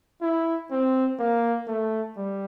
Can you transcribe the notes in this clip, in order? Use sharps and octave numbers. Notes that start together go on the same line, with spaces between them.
E4
C4
A#3
A3
G3